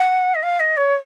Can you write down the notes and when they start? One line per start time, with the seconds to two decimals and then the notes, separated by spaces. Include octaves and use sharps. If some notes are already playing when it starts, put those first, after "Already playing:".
Already playing: F#5
0.35 D#5
0.43 F5
0.60 D#5
0.77 C#5